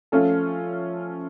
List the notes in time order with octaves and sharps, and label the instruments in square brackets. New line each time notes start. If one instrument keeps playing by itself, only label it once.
[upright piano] F3 A3 C#4 F4 A4